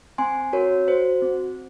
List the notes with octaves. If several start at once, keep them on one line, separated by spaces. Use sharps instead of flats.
C4 G#5 C6
F#4 A#4 C#5
F#4 C5
C4